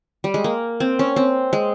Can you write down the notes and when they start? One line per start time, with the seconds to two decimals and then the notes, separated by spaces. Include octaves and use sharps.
0.24 G3
0.34 G#3
0.44 A#3
0.80 C4
0.99 C#4
1.16 C4
1.53 G#3